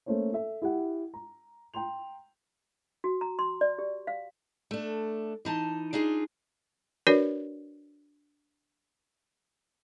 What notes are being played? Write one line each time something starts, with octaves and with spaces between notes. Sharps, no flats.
A3 A#3 C#4 C5 C#5
A4 E5
E4 G4 F#5
A#5
G5 A#5 C6 F7
F#4
A#5
C6
D5
G4
F5
A3 D4
E3 D#4 A5
D4 D#4 F4 G#4
D4 F#4 A#4 B4 C#5 D5